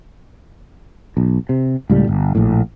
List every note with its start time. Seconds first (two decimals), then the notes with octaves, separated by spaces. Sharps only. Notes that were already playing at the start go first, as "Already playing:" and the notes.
1.17 B1
1.49 C3
1.90 C#2 A2 G3
2.08 G1
2.35 A#1 A2